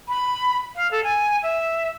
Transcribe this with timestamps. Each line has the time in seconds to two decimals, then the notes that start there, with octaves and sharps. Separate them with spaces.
0.08 B5
0.76 F5
0.91 A4
1.04 G#5
1.43 E5